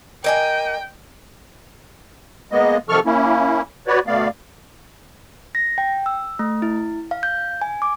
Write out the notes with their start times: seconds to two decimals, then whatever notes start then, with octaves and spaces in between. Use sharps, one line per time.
0.24 A#3 D#5 G5 G#5
2.52 G#3 A#3 B3 D#5
2.89 C3 D#3 F3 A4 C#6 F6
3.06 A#3 C#4 E4
3.87 F#4 B4 C#5 D5
4.07 D2 B2 A3 B3 D5 F5
5.55 A#6
5.78 G5
6.06 E6
6.39 A3
6.62 E4
7.11 F5
7.23 G6
7.62 G#5
7.82 D6